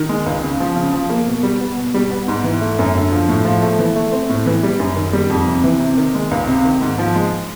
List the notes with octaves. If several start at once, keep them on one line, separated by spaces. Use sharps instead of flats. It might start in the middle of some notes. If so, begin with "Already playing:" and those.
Already playing: D#3
G#3
C#2
C#3
F3
C#3
F3
A#3
B2
G3
B3
B2
G3
B3
G#2
E3
A3
F#2
D3
F3
A2
F3
A3
E3
A3
C4
A2
E3
G3
F#2
D#3
G3
F2
C3
E3
C3
D#3
G#3
C#2
C3
D#3
G#2
F3
G#3